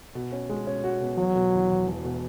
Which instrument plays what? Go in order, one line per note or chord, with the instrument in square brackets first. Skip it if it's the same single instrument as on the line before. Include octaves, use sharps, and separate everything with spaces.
[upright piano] B2
C#4
G#3
C#4
F#4
B2
[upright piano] E1 [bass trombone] F#3
[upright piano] B2
E2
E2
E1
B2